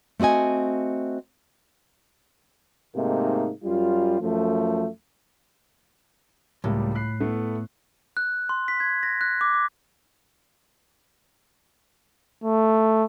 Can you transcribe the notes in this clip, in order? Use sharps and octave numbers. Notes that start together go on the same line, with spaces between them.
A3 C4 F#4 D#5 G#5
G#2 C3 A3 A#3 D#4
F#2 G3 F4
F#2 F3 A3
C#2 A2 G3 A#3
B5 F#6 C7
A3 B3 E4
F#6
C6
B6
G#6
A#6
F#6
D6
D6
A3